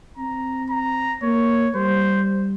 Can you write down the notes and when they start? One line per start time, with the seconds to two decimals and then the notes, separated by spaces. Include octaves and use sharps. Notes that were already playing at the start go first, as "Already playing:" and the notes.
0.17 C4 A#5
0.70 A#5
1.23 A#3 C#5
1.75 G3 C5